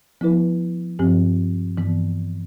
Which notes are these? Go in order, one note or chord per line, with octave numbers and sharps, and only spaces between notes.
F3 B3 E4 B4
G2 F3 C4 G4
G2 E3 B3